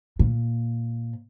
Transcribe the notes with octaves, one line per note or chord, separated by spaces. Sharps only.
A#2